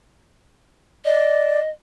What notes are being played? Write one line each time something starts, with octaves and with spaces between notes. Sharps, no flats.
D5 D#5